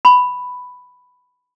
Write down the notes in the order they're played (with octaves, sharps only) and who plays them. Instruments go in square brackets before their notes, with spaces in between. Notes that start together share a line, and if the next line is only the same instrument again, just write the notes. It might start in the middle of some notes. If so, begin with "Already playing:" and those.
[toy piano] B5